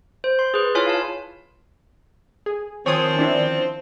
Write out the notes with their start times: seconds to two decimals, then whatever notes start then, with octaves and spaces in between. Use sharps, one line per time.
0.24 C5
0.39 C6
0.54 G#4 B4
0.75 E4 F4 C#5 G#5 F6
0.86 F5 A5
2.46 G#4
2.86 D#3 F3 C4 C5 C#5 G#5 D#6
3.17 C#4 D4 E4